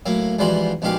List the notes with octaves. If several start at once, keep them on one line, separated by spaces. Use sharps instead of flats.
A2 F#3 A#3
E2 G#2 F3 G3 F#4 C6
A#1 G#2 B2 G4 F5 D6